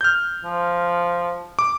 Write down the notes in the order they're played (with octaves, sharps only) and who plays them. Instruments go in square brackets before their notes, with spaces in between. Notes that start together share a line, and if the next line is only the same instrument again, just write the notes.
[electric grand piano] F6 G6
[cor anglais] F3
[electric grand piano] D6